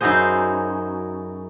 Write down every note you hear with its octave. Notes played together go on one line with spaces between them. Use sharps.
F#2 D#4 E4 F#4 G#4 C5